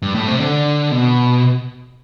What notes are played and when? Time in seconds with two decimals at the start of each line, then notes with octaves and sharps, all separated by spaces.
0.02 G2
0.15 A2
0.28 C3
0.40 D3
0.91 B2